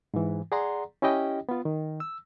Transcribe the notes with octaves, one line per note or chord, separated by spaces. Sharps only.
G#2 E3
G#4 D5 F#5 A#5 C6
C#4 E4 G4 D#5 G5
B3 F4
D#3
E6